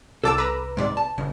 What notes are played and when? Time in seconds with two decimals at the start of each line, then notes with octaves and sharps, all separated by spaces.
0.24 C2 A4 A5 D6 E6
0.38 B4 A#5
0.77 G#2 C3 D5
0.97 A5
1.18 G1 C#3